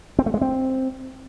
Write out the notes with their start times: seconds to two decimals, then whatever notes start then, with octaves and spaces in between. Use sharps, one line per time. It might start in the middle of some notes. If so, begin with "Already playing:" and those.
0.19 C4
0.26 A3
0.34 G#3
0.41 C4